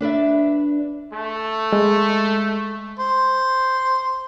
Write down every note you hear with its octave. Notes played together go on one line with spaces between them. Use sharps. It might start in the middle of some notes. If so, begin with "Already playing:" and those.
D4 B4 D5 E5
A3
G#3
C5